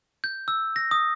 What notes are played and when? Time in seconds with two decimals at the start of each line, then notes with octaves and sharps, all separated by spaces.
0.24 G6
0.48 E6
0.76 A#6
0.91 D#6